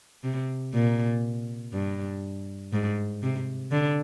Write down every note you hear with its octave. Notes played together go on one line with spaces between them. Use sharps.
C3
A#2
G2
G#2
C3
D3